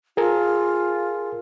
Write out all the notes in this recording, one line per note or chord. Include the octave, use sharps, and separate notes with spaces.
F4 G#4 A#4 G#5